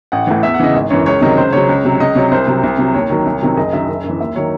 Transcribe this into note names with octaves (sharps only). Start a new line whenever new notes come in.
A1 F#5
A2 E3
E2 E5
F#5
C#3 E3 D#5
G#1
F#2 E3 C#5
C#2 C#5
C3 D#3 F#3 D#5
C#2 C5
C#3 F#3 C#5
C#2
C3 F#3
C#2 D#5
C3 F#3 C#5
C2 C5
C3 F#3
C2
C3 F#3
D#2 C#5
D#3 F#3
C2
C3 D#3 F#3
F#1 D#5
F#2 D#3 F#3 E5
F#1
F#2
E3
D#2 E5
D#3 F#3 C#5